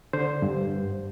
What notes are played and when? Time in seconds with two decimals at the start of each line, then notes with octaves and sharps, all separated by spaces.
0.13 D3 C5
0.42 G2
0.70 G2